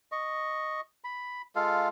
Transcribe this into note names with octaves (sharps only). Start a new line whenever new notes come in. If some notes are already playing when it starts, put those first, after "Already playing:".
D#5 C#6
B5
G#3 F4 A4 F5